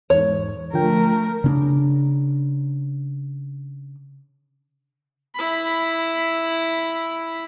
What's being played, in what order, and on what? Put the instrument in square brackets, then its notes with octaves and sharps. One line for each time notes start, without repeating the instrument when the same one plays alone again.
[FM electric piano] E2 G#2 [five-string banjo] C#5
[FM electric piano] D3 F3 G5 [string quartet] A3 A#4
[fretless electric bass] C#3 C#4 D4
[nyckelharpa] E4 B5